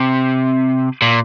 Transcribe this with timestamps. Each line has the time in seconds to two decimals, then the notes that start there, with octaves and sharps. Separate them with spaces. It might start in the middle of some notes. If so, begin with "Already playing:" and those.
Already playing: C3
1.02 A#2